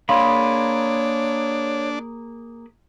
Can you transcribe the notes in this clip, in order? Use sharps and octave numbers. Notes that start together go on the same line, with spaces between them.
A#3 D4 G#4 C#5 F5 B5 C6